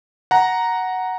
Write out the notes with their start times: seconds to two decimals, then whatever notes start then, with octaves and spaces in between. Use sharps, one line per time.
0.31 F#5 A#5